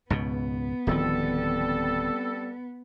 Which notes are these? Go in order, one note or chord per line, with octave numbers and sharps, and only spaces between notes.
C#2 G#2 B2 B3
D1 D#3 F3 G3 C4 A4